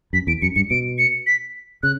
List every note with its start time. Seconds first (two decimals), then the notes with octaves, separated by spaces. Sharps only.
0.13 F#2 B6
0.27 E2 D7
0.42 F#2 C#7
0.56 G2 C#7
0.70 B2 D7
0.98 C#7
1.26 B6
1.83 C#3 F#6